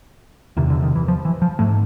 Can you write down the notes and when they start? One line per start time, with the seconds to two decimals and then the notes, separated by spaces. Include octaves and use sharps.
0.57 E2 C3 D#3
0.70 D3
0.83 D#3
0.95 E3
1.08 F3
1.25 E3
1.42 F3
1.59 G#2 A3